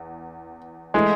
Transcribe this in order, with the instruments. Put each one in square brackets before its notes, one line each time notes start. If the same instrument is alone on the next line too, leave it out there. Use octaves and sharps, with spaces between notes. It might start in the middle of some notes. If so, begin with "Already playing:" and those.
Already playing: [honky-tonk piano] E2
[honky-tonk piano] E3 A3 [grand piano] G#3